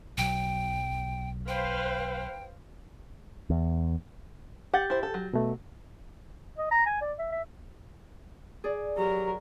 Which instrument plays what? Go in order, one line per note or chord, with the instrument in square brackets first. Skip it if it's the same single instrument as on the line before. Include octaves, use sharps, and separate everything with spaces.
[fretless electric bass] B1 F#3 [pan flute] G5
[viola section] B4 C5 F5 [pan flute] G5
[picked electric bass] E2
[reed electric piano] G4 G6 A6 [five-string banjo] F#5
[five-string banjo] E4 C5
A4
F#3
[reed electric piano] B2 A3
[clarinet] D#5
A#5
G#5
D5
E5
E5
[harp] G#4 D5
[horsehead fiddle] F#3 A#4 [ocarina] G4